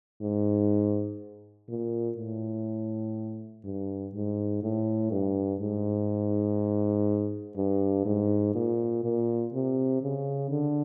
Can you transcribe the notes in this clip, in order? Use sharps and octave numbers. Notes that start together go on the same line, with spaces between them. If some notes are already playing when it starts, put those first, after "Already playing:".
G#2
A#2
A2
G2
G#2
A2
G2
G#2
G2
G#2
A#2
A#2
C3
C#3
D3